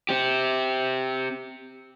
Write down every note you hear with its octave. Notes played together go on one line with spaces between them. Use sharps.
C4 G4